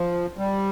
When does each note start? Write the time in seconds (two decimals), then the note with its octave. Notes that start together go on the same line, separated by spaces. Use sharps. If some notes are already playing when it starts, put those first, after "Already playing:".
Already playing: F3
0.38 G3